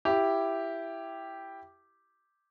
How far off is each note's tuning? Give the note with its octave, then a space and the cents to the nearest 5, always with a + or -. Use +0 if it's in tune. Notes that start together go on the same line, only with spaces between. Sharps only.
E4 +10 G4 +0